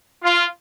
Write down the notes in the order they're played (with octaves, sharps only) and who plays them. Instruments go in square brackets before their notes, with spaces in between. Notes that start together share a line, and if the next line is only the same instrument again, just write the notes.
[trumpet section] F4